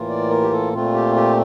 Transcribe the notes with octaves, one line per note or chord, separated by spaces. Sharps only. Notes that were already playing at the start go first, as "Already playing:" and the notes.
Already playing: A2 E3 A#3 F4
D5
A#4
G4
A4
A#2 A3 C4 F4
G4
G4